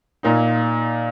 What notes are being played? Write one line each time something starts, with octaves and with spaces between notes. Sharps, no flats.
A#2 A#3 D#4